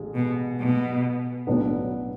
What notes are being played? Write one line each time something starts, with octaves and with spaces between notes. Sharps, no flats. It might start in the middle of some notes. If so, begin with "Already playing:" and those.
Already playing: A1 G#3
B2
B2
B1 A2 F#3 B3 D4